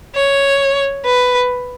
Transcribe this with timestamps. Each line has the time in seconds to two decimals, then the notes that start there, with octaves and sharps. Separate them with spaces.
0.15 C#5
1.06 B4